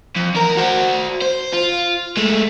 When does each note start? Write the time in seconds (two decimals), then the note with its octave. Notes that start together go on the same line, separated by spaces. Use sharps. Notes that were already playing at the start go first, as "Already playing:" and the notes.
0.16 F2
0.34 E2 A#4
0.57 F#4 C5
1.22 C5
1.53 F4
2.17 G#3 A3